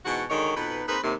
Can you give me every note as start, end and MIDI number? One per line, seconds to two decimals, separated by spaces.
0.05 0.24 44
0.05 0.24 47
0.05 0.24 52
0.05 0.24 66
0.30 0.54 50
0.30 0.54 51
0.30 0.54 56
0.30 0.54 63
0.30 0.54 66
0.30 0.54 73
0.56 0.82 41
0.56 0.82 47
0.56 0.82 63
0.56 0.82 71
0.88 0.98 58
0.88 0.98 60
0.88 0.98 63
0.88 0.98 68
0.88 0.98 71
1.04 1.13 39
1.04 1.13 48